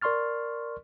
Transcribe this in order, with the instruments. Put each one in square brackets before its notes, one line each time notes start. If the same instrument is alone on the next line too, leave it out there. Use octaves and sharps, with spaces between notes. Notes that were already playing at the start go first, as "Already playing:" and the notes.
[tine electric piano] A#4 D5 C6 C#6 F6 A6